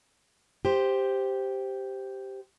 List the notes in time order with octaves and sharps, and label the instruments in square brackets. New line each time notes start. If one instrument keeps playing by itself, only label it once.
[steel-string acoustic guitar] G4 C5